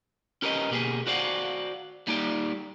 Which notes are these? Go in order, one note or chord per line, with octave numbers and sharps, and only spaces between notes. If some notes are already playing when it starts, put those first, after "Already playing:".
C#4 G4 A#4 B4 C#5 D#5
B2 A#3 G4 G#4
F#4 C5 D5 F5 F#5
G3 A#3 D#4 G4 D5